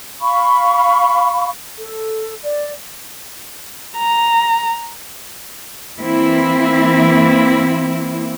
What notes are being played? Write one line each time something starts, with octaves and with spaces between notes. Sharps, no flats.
F5 B5 C#6
A4
D5
A#5
E3 A#3 C4 E4